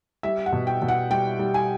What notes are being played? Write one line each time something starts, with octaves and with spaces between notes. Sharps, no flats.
G3 E5
F#5
B2
G5
B2
F#5
G3 G5
G3
G#5